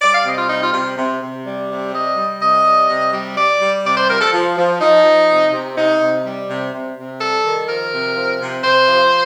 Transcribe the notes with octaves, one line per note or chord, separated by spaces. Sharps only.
G3 D5
F5
C3 D#5
F4
G3 D#4
F4
C3 F4
C3
C3
G3
C3
G3 D#5
G3
C3 D#5
G3
C3
G3
G3 D5
G3
C3 D5
C5
F3 A#4
A4
F3
F3
F3 D#4
F3
C3
C3
C3 D#4
C3
G3
C3
C3
C3
G3 A4
D#3
F3 A#4
C3
F3
C3
C3 C5
F3